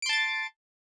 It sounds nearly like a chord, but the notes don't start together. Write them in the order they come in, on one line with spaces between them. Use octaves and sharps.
D7 C6 A5 A6